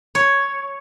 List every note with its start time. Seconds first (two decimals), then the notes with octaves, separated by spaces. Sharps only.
0.15 C#5